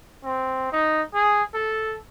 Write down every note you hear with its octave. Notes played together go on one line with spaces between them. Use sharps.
C4
D#4
G#4
A4